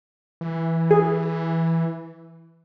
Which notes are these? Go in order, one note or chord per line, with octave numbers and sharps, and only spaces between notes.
E3
G#4